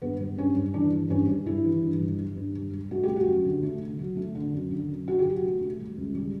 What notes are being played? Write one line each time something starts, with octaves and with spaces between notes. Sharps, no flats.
G2 B3
G3
G2 C#4
G2
E3 D4
G2
G2 C#4
G2
G3 E4
E3
G2
G3
G3
G2
G3
G3
A3 F#4
G4
A3
F#4
F#2
D3
A3
D3
F#3
A3
D3
F#2
D3
F#2
D3 F#4
G4
F#3 F#4
A3
A3
G3
C#2
G3